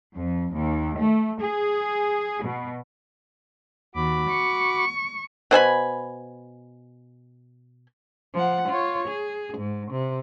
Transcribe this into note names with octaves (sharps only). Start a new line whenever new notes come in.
F2
D#2
A3
G#4
B2
D#2 F#4 B5 D6
C#6
B2 C5 G#5 B5
F3 F#5
F4 C#5
G#4
G#2
C3